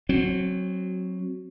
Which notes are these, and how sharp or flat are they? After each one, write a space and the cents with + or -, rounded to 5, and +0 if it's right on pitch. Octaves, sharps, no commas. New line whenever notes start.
F#3 +0 C4 +20